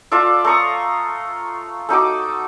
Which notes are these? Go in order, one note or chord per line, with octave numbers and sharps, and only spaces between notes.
F4 A4 D5 E5
A3 A#5 C#6 D#6
A3 D#4 F#4 D6